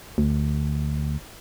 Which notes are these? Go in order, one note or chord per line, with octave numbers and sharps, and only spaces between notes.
D2